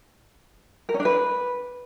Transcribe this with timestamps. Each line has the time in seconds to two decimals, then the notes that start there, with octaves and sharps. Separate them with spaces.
0.89 A#4
0.94 C#4
1.00 D4
1.05 B4